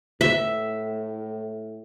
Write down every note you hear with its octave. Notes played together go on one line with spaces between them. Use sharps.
A2 E5